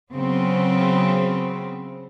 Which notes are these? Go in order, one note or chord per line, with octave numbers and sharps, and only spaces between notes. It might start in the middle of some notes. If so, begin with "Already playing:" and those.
C#3 F#3 B3 C4